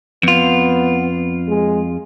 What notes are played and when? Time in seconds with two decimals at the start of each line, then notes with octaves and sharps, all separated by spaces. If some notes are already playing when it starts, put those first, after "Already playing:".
0.23 F2 B3 F4
1.48 G#3